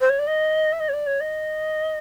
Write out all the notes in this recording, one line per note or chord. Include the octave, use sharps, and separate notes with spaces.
C5
C#5
D5
D#5
E5
D#5
C#5
D5
C#5
D#5